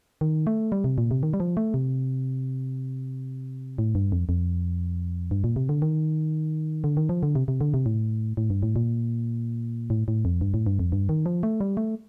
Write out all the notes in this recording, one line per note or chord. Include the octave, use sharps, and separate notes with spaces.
D#3
A3
G3
C3
A#2
C3
D#3
G3
F3
A3
C3
A2
G2
F2
F2
G2
A#2
C3
D3
D#3
D3
D#3
F3
D3
C3
C3
D3
C3
A2
A2
G2
A2
A#2
A2
A2
F2
G2
A2
G2
F2
G2
D#3
F3
A3
G3
A3